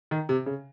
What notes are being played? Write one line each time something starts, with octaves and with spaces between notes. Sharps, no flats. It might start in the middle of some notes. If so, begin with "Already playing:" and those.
D#3
C3
C#3